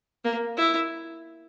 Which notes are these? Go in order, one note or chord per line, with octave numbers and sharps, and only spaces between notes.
A#3
E4